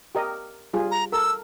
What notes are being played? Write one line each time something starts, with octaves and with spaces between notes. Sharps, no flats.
G4 A#4 D#5
G3 F4 G#4
A#5
A4 A#4 E6